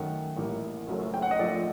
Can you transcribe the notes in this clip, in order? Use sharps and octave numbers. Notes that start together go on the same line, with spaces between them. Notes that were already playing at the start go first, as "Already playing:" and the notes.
Already playing: F#2 D#3 A3 F#5
A1 A2 G3 A#3
F#1 F#2 F#3 A3
G5
F#5
D#5
A#1 A#2 A3 D5